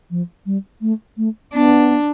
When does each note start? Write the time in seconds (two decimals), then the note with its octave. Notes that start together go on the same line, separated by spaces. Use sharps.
0.11 F3
0.46 G3
0.81 A3
1.17 A3
1.54 B3 D4